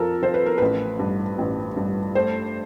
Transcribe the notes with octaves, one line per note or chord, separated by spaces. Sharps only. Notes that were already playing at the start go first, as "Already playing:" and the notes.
Already playing: F2 F3 A4 A#4
F3 C5
B4
A#4
A1 B4
G2
A1
G2
A3 C5